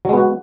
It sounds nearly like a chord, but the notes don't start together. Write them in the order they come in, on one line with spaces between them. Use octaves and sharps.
F#3 G#3 B3 F#4